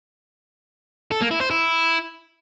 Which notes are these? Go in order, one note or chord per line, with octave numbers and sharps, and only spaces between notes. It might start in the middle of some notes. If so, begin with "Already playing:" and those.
A4
A#3
E4
C5
E4